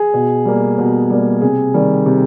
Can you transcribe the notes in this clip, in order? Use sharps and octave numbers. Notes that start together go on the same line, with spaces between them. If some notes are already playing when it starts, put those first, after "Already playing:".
Already playing: G#4
B2
G3 A#3
B2
G3 A#3
C3 G#4
D#3 G3
C3